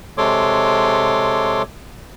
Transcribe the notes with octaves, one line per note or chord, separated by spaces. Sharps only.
C3 G#3 A4 C#5 C6 D6